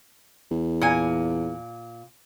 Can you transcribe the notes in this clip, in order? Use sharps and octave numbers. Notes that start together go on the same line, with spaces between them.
E2
A#2 G#5